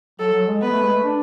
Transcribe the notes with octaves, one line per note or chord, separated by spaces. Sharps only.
F#3 A4
F#3
G#3
B3 B4
A3
G#3
A3
D4